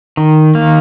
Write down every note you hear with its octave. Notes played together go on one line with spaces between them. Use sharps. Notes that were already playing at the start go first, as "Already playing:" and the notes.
D#3
A#3